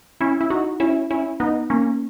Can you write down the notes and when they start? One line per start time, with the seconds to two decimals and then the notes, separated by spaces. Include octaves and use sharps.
0.21 C#4 E4
0.41 E4
0.50 D#4 F#4
0.80 C#4 E4
1.11 C#4 E4
1.40 B3 D#4
1.70 A#3 C#4